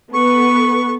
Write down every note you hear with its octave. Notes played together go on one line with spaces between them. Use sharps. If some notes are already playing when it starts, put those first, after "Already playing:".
B3 A4 B4 C#6